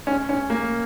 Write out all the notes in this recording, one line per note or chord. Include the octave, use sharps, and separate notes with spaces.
C#4
C#4
A#3